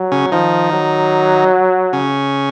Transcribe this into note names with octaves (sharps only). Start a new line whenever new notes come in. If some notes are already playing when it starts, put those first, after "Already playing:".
Already playing: F#3
C#3 C#4
D#3 F3 D#4
F#3
C#3 C#4